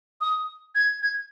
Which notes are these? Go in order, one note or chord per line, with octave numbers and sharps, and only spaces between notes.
D#6
G#6
G#6